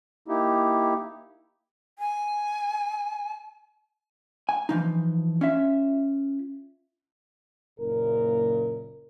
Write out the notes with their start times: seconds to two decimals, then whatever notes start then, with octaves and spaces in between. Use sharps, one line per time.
0.28 A#3 D#4 E4 G4
1.99 G#5
4.49 G#5
4.69 E3 F3 D#4
5.41 C#4 F4 E5
7.79 F#1 A#2 A#4